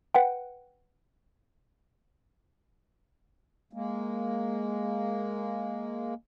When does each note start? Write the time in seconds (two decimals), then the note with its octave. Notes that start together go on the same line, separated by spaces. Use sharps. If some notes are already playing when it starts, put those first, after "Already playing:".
0.15 B4 F#5 G5
3.73 G#3 A#3